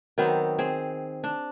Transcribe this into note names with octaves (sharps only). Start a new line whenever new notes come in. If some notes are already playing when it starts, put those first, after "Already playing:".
D#3 F#3 B3 C4
C4 G#4
D4